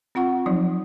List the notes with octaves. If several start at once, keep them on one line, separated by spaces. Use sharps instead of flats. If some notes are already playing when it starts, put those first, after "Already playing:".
C4 F4 F#5 C#6
F3 F#3 D#4